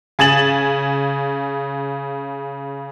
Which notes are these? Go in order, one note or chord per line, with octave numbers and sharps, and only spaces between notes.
C#3 G#5 A6 E7 F#7